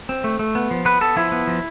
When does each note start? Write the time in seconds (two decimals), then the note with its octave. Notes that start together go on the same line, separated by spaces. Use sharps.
0.09 C4
0.24 A3
0.39 A3
0.55 B3
0.71 F3
0.85 B3 B4
1.01 B3 A4
1.16 F3 E4
1.32 B3
1.47 F3